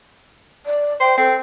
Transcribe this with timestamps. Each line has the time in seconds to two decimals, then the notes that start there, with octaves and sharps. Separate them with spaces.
0.66 D5
1.00 C5 G5
1.18 C4 A4